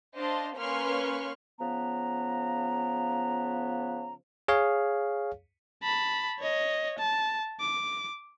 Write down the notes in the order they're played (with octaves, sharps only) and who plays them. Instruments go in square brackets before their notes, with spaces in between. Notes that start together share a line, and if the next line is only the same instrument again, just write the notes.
[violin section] D4 C5 D#5 F5 A5 C6
A#3 C#4 B4 C6 C#6 F6
[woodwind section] C#3 F3 B3 A#5
[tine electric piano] G#4 C#5 F5
[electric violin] A5 B5
C#5 D#5
A5
D6